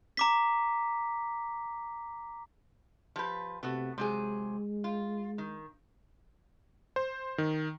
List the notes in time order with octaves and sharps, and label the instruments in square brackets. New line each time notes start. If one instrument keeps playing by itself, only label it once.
[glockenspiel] A#5 D6 B6
[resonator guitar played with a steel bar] F3 G4 B4
[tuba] C3 [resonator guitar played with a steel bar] A3 B3 F#4
[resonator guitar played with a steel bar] C3 F#3 G#4 [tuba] G#3
[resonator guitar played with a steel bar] F4
D#3
[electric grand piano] C5
D#3